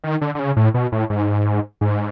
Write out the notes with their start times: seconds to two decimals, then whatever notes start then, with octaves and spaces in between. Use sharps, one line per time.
0.04 D#3
0.21 D3
0.35 D3
0.39 C#3
0.56 A2
0.74 B2
0.92 A2
1.10 G#2
1.81 G#2